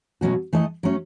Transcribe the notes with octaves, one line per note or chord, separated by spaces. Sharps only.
B2 F#3 A3 C#4 F#4
E3 A3 E4 A4 D#5
F#3 A3 C#4